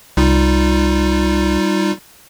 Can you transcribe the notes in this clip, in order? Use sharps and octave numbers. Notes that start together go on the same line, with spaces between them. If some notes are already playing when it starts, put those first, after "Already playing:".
C2 G3 D#4 F4